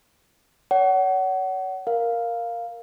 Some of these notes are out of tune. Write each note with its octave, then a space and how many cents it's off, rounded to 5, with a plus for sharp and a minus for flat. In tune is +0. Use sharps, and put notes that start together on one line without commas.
C#5 +35 F#5 +25
A#4 +0 F5 +0